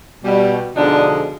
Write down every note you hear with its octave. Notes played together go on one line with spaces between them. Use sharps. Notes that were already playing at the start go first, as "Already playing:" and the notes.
B2 G3
B2 D3 F3 G#3 D4 D#4